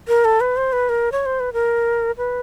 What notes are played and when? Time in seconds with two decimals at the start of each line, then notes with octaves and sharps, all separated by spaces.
0.08 A#4
0.25 A4
0.41 B4
0.57 C5
0.73 B4
0.89 A#4
1.12 C#5
1.26 C5
1.40 B4
1.53 A#4
2.18 B4